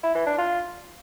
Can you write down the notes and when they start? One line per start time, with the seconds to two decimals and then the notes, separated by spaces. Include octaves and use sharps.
0.03 E4
0.15 E3
0.27 D4
0.38 F4